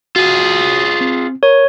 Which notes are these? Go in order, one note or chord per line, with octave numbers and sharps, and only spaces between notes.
F4 F#4 G#4
C4
A#4 C#5